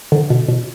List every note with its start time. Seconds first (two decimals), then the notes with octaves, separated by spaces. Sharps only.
0.12 D3
0.30 B2
0.48 B2